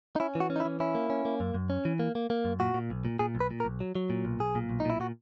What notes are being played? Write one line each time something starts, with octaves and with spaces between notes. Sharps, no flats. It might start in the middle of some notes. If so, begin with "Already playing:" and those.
D#4
C#4 E4
E3
F#4
C#4
D#4
E4
E3
C#4 E4
A#3
C#4
A#3
F#2
F#2
C#4
E3
A#3
A#3
A#3
F#2
A#2 F#4
A#2
B1
A#2
A#2 G#4
B1
B4
A#2
A#4
B1
F#3
F#3
A#2
B1
B1 G#4
A#2
B1
D#4
A#2 E4
A#2 F#4